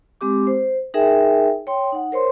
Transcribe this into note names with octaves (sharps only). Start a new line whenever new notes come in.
G#3 C4 G4 D6
C5
D#4 G#4 A#4 E5 G5 G#5
C#5 G5 C6
D#4 F#5
A#4 C5 C#5 C6